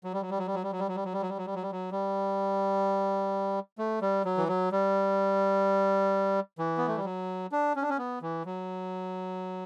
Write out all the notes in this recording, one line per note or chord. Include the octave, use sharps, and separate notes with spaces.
F#3
G3
F#3
G3
F#3
G3
F#3
G3
F#3
G3
F#3
G3
F#3
G3
F#3
G3
F#3
G3
F#3
G3
F#3
G3
A3
G3
F#3
E3
F#3
G3
E3
B3
A3
G3
F#3
D4
C#4
D4
C#4
B3
E3
F#3